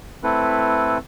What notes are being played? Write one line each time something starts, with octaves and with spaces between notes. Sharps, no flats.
A3 C4 E4 A4 B4